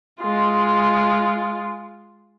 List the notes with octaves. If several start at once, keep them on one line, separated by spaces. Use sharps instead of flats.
G#3 F4